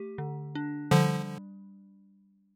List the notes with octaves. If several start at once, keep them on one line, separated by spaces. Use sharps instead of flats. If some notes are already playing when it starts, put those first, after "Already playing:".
Already playing: A3 G4
D3
D4
D3 F3 G3